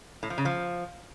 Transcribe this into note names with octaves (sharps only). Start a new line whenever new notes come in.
A2
F3
C#3
F3